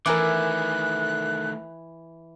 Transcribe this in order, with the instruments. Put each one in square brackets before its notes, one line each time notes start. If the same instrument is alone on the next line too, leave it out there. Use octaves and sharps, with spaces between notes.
[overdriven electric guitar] D#3 A3 [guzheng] E3 E4 [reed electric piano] A#4 G#5 D6 [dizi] F#6